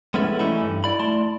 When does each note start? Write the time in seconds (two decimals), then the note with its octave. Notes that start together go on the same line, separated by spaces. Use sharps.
0.14 G#3 B3 C#4 E4 A4
0.39 E3 G3 A3 C#4 D#4 E4
0.61 G2
0.84 E4 D5 B5
0.99 A3 E4 D5 A5 C6